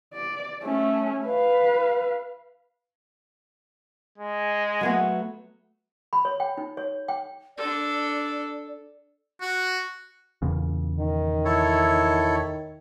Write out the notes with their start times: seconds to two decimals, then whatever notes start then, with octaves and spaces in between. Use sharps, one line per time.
0.13 D5
0.63 A3 C#4
1.26 B4 F5
4.18 G#3
4.81 F#3 A3 B3
6.13 B5
6.25 C#5
6.40 G5
6.58 D#4
6.77 C#5
7.08 G5
7.58 D4 A4 D5
9.41 F#4
10.42 E2 A#2 C#3
10.99 D#3
11.45 E4 A4 C#5